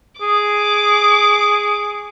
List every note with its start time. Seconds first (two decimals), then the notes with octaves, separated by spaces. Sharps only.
0.21 G#4 D6